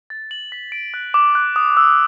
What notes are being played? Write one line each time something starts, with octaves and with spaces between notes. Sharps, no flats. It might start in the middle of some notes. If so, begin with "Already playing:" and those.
A6
F#7
B6
D7
F#6
D6
F#6
D#6
E6